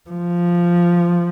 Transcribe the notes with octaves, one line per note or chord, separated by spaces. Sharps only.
F3